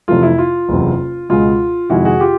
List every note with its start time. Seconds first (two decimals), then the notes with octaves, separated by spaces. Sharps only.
0.08 F2 C3 E3 A3 F4
0.23 E4
0.38 F4
0.69 F#1 E2 C3
1.29 C#2 B2 G#3 F4
1.90 F2 C3 D#3 G#3 E4 F#4
2.05 F#4 G#4
2.20 F4 G4